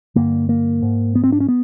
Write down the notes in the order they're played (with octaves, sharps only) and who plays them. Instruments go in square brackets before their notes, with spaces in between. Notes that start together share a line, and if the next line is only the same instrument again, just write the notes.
[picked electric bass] G2 D3 A#3
A#3
G#2
B3
C4
D4
C#4
B3